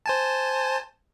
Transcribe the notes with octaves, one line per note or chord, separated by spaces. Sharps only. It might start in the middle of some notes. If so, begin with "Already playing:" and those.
C5 G#5 A5